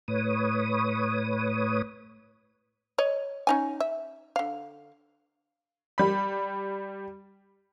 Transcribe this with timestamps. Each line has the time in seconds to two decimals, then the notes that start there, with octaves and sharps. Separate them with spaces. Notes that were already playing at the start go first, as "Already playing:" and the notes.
0.08 A2 B4 C#5 D#6
2.98 C#5 D#5
3.47 C#4 D#4 G#5
3.80 E5
4.36 D3 F5
5.98 G3 B5